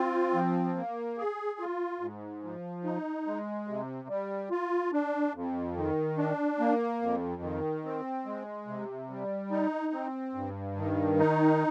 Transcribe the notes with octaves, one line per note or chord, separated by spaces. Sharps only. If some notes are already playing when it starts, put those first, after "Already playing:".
Already playing: C4 F4
F3
A#3
G#4
F4
G#2
F3
D#4
G#3
C3
G3
F4
D4
F2
D#3
D4
A#3
F2
D#3
C4
G#3
C3
G3
D#4
C4
G2
D#3
D#4